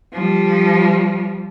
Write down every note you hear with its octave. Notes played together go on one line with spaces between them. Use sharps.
F3 G3